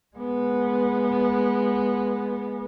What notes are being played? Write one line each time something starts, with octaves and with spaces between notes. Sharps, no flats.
G#3 B3